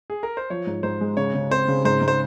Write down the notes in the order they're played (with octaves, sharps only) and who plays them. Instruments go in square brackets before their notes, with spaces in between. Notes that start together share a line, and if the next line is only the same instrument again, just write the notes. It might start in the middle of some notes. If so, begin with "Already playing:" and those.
[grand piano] G#4
A#4
C5
[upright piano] F3 [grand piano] C#5
[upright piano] G#2
[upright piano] G#2 [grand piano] C5
[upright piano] G#3
[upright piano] C#3 [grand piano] C#5
[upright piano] C#3
[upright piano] C4 [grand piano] C5
[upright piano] C#3
[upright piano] G#2 [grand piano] C5
[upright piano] G#2
[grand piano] C5